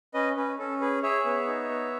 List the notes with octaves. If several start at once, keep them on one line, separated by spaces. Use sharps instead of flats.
C#4 B4 D#5
C#4 B4
C#4 A4
G#4 B4
G#4 C#5 E5
B3
D#4
B3